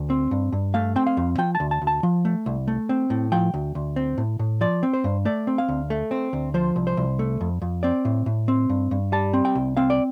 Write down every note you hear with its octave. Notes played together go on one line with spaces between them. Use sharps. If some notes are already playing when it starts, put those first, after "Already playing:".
Already playing: D2
C4
G2
G2
A3 F5
C4 G5
F5
F2
F3 G5
A5
D2
A5
D2
A5
F3
A3
C2
A3
C4
A2
F3 G5
D2
D2
C4
A2
A2
F3 D5
C4
C5
G2
A3 D5
C4
F5
D2
A3
C4
D2
F3 C5
C2
C5
C2
A3
F2
F2
C4 D5
A2
A2
C4
G2
G2
G3 A5
C4
G5
C2
C4 F5
D5